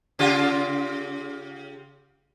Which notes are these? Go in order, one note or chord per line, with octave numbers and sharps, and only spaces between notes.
C#3 F4 G4